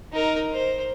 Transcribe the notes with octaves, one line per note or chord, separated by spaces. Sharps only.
D#4 A#4
C5